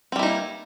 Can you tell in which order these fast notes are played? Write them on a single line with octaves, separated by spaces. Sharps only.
C4 G3 E4 D#4 A#3